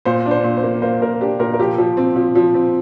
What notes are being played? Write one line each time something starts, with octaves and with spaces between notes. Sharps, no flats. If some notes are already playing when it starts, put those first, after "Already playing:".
A#2 C5
D4
C5
A#2
C5
A#3
A#3 C5
A#2 A#4
D4 G4
A#2 A#4
A#4
F3 G4
F3
C4
F3
F3
C4